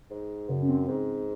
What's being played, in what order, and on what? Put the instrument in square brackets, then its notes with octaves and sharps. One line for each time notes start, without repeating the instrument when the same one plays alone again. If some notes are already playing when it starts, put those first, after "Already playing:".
[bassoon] G#2
[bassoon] F#2 [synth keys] C#3
[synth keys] C#4
C4
[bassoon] G#2 [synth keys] C4